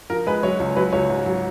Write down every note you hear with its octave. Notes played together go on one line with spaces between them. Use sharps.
F3 A#4
G#3 B4
F#3 C#5
C#2
F#3 B4
C#2 C#5
G#2
F#3